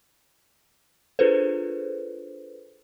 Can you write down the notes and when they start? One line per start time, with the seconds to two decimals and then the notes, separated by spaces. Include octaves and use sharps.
1.19 D4 F4 G#4 A4 B4 C5